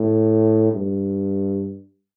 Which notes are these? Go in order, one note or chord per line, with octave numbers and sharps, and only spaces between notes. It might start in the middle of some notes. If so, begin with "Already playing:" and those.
Already playing: A2
G2